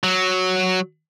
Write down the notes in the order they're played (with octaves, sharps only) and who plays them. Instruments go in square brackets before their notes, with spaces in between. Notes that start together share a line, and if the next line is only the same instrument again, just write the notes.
[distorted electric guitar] F#3